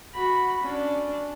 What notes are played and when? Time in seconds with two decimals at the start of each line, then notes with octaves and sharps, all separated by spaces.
0.15 F#4 B5
0.63 C#4 D4